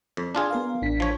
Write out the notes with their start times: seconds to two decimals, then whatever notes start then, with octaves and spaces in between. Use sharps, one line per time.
0.17 F2
0.35 D4 F4 G#4
0.51 B3 A#4 F5
0.82 A1 D4 B6
1.00 F3 C#5